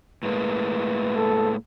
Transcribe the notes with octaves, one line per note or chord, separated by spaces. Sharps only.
A2 G#3 A#3 B4
A4